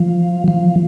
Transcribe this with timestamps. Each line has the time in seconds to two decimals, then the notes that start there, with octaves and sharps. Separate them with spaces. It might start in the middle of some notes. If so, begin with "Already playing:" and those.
Already playing: F3
0.48 F3